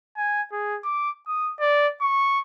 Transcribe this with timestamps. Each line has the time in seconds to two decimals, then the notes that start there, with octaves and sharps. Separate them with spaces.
0.17 G#5
0.52 G#4
0.84 D6
1.27 D#6
1.60 D5
2.01 C#6